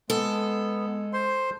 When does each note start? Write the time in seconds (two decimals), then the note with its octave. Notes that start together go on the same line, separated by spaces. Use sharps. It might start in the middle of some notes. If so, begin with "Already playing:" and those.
0.10 G#3 B3 A4
1.13 C5 C6